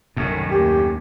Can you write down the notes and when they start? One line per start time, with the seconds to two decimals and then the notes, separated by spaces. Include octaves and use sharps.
0.16 C2 F#2 A2 D#3
0.51 D#2 G4